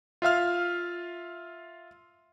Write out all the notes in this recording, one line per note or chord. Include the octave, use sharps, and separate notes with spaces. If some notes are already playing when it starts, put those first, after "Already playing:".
F4 E5 F5 F6